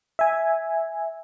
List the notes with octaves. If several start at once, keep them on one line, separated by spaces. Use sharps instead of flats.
E5 G#5